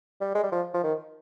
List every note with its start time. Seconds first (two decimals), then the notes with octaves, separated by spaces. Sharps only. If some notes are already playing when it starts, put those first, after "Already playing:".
0.21 G3
0.35 G#3
0.43 G3
0.52 F3
0.74 F3
0.83 D#3